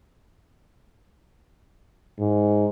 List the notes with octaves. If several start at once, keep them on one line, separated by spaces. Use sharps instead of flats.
G#2